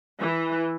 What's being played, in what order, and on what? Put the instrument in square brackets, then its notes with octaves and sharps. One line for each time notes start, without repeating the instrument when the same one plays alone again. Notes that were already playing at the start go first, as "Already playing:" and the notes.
[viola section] E3